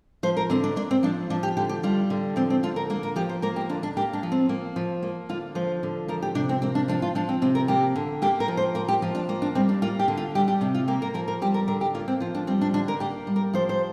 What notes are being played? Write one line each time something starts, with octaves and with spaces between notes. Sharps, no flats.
F3 C5
A#4
D3 C4
D4
A#3 D4
C4
F3 D4
F3 D4
G4
D3 G4
G4
G3 F4
D3
F3 C4
C4
D3 F4
A#4
A#3 A#4
A#4
F3 G4
C5
A#3 A#4
G4
D3 D4
D4
A#3 G4
D4
F3
C4
A#3
F3
A#3
D3 F4
F3 C5
D3
F3 A#4
G4
C3 D4
C4
A#3 C4
D4
F3 D4
F4
F3 D4
C4
C3 C4
A#4
A#3 G4
D3
A#3 G4
A#4
F3
C5
A#3 A#4
G4
F3 F4
D4
A#3
D4
G3 C4
D4
A#3 F4
G4
D3
F4
G3 G4
G4
C3 D4
F4
A#3 G4
A#4
F3 A#4
A#4
G3 G4
A#4
D3 A#4
G4
A#3 F4
C4
F3 F4
D4
G3 C4
D4
D3 D4
A#4
A#3 G4
G3
A#4
F3 C5
C5